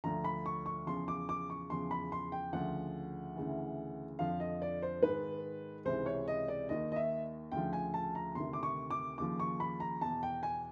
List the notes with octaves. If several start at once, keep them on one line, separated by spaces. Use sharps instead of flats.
D2 D3 F3 A#5
B5
C#6
C#6
E2 C#3 F3 C6
D6
D6
C#6
E2 C#3 F3 C6
B5
C6
G5
D2 C#3 F3 F#5
D2 C#3 E3
F2 D3 F3 F5
D#5
D5
C5
G#2 D#3 B4
C#2 C3 E3 C5
C#5
D#5
D5
D#2 D#3 D#5
D#5
E5
D2 C#3 F3 G5
G#5
A5
A#5
D2 C3 D#3 C6
D6
C#6
D6
D#2 C#3 F3 D6
C#6
B5
A#5
E2 B2 A5
G5
G#5